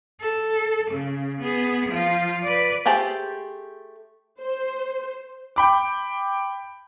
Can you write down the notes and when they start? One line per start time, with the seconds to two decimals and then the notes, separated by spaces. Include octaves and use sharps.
0.21 A4
0.90 C#3
1.41 B3 G#4
1.89 F3 F4
2.43 B4 D5
2.86 A3 G4 G#4 C5 A5
4.41 C5
5.56 G5 B5 D6